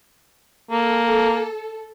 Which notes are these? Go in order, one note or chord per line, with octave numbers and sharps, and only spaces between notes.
A#3 A4